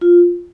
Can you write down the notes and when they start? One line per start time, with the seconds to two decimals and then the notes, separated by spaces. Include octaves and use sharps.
0.01 F4